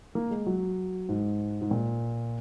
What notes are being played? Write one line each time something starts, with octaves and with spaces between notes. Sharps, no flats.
A#3
G#3
F#3
G#2
G#2
A#2